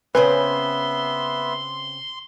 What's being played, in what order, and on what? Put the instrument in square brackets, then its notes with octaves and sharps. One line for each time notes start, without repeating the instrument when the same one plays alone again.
[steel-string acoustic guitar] C#3 C4 G#5 [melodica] B3 E5 [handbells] B4 [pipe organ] C6